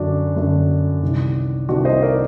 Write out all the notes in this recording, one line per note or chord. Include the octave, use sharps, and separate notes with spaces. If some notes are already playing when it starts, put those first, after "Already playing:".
Already playing: F#2 D3 D4 F#4
F#2 D3
C2 C3 D#3
C2 C3 D#3 D4 F#4
C5 D#5
A#4 D5